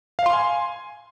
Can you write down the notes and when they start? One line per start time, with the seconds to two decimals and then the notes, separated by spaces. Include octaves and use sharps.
0.19 F5
0.26 C6
0.33 G#5